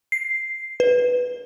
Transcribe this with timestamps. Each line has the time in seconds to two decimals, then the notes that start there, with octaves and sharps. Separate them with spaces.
0.12 C7
0.80 B4